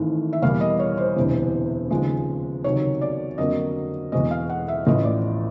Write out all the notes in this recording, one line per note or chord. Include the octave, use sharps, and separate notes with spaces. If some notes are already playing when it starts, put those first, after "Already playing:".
Already playing: G#1 G#2 E3 A3
E5
E2 B2 G3 A#3 F5
D#5
C#5
C5
E1 D2 C3 E3
D#2 C#3 F3 G#3
C#2 C3 D#3 F#3 C#5
D5
F2 D3 F#3 A#3 D#5
E1 E2 B2 G#3 D#5
F5
F#5
E5
A1 A2 F3 D#5
D5